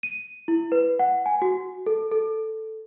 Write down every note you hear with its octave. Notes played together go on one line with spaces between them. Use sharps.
D#7
E4
B4
F#5
G#5
F#4
A4
A4